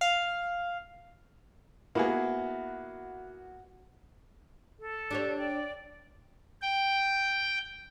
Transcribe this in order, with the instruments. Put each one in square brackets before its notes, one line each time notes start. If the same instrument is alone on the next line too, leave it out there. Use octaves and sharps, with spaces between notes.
[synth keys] F5
[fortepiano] A#3 B3 G#4 [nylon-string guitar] E4 [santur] F#4
[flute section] A4
[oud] D4 G4 C#5
[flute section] D5 G5
[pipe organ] G5